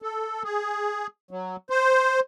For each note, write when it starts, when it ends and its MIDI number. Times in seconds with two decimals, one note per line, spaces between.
0.02 0.43 69
0.43 1.07 68
1.31 1.56 54
1.70 2.20 72